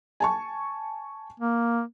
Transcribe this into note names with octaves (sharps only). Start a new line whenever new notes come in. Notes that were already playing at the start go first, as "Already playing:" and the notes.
G#5 A5 C#6
A#3